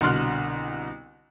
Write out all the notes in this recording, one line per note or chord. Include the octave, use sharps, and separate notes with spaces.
C2 B2 D3 C6 F6 F#6